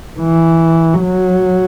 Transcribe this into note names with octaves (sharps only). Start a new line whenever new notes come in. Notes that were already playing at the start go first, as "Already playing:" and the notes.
E3
F#3